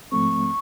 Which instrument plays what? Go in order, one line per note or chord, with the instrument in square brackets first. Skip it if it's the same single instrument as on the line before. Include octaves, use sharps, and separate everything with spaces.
[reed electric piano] G#2 F3 A3 C4 [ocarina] C#6